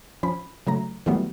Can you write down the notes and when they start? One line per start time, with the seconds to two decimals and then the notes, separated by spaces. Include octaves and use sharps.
0.23 F3 C#4 B5
0.67 C#3 F#3 A3 A#5
1.06 D#3 E3 F#3 G3 A3 B3